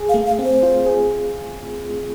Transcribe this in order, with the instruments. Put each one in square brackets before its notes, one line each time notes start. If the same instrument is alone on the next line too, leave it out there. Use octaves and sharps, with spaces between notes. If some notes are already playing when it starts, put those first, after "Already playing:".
Already playing: [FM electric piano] G#4
[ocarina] F5
[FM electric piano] A3
[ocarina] F5
[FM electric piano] C4
[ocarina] C5
[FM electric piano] F4
G#4